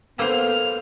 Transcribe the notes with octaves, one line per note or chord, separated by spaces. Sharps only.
F#2 A#3 B3 A4 C5 F6